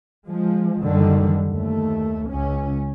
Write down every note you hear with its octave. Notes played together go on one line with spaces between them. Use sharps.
F3 G#3
F#1 F#2 D3 D#3 G3
D#2 A3
C#2 C#4